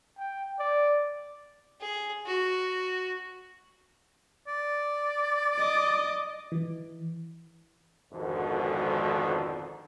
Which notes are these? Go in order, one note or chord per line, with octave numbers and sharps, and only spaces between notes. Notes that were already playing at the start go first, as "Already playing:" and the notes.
G5
D5
G#4
F#4
D5
D#5 D6
E3
G#1 F2 G#2 B2 D3 D#3